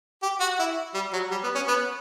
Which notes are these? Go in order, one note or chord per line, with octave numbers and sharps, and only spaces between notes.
G4
F#4
E4
G3
F#3
G3
B3
C#4
B3